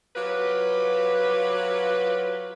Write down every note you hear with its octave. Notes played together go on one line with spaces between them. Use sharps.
F#3 F4 G4 B4